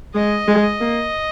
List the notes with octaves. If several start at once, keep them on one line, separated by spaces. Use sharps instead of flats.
G#3 D#5
G#3
A#3